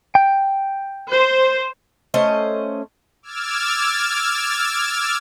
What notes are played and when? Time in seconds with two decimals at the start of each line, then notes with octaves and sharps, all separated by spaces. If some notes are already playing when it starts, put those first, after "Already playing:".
0.15 G5
1.12 C5
2.14 A3 C#4 C5 D#5
3.23 D6 E6 F6 G#6 A6